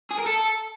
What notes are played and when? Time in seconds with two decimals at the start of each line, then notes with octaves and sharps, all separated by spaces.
0.11 G#4
0.18 A#4
0.26 A4